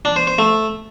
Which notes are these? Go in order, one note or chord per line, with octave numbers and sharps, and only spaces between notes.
D4
C5
C5
A3